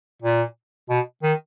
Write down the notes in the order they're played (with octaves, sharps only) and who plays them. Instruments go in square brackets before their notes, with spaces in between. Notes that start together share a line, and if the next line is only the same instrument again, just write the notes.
[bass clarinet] A#2
B2
D#3